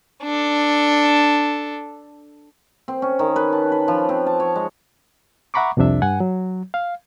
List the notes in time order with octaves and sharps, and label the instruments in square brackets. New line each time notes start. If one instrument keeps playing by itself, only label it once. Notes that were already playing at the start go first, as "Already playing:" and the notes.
[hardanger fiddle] D4 A4
[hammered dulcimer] C4
C#4
D#3
B4
A5
B4
F3
C4
A5
C#5
G#3
[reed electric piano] E5 F#5 A#5 B5 C#6 D6
C2 F2 C3 D4 E5
G2 F#5 G#5
F#3
F5